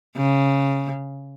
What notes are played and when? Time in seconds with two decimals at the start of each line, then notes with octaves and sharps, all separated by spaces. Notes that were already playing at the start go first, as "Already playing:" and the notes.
0.17 C#3